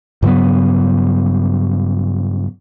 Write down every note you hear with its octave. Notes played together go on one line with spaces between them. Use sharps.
G2 C#3 F#3 B3